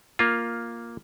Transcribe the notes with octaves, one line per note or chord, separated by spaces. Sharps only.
A#3 F4